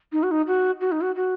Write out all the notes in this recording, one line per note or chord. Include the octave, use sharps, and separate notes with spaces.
D#4
F#4
D#4
F#4
F#4
D#4
F#4
F#4